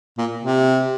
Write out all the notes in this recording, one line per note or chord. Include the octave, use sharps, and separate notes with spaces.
A#2
C3